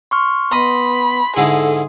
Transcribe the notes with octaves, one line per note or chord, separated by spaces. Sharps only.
C6 C#6 F6
B3 D#5 B5 C6
G#2 D3 E4 G#4 A4